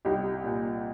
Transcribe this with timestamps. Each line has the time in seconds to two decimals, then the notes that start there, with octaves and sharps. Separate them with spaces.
0.05 C2 D#4 G4
0.44 A#2